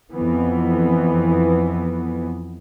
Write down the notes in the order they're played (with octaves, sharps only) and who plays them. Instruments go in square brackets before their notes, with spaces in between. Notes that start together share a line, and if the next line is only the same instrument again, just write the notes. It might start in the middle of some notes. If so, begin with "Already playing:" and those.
[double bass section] F2 E3 B3